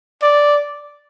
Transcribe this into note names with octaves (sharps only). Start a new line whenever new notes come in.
D5